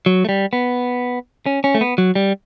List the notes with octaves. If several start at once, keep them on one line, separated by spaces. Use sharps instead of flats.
F#3
A3
G3
B3
C#4
C#4
A3
B3
F#3
G3